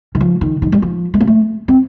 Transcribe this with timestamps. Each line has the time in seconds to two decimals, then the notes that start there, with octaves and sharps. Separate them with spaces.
0.15 D#3
0.21 F3
0.41 D#3
0.62 D#3
0.72 G3
0.82 F3
1.14 A3
1.21 A#3
1.27 A3
1.68 C4